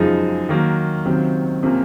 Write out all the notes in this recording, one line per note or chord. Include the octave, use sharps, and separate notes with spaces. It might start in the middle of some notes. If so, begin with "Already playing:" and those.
Already playing: F#2 C#3 F3 G#3 D#4
D#3 F#3 A#3
C#2 C3 D#3 F#3 C4
C3 F3 A#3 C#4